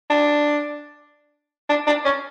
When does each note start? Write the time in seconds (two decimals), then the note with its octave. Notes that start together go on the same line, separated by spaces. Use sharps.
0.10 D4
1.69 D4
1.87 D4
2.05 C#4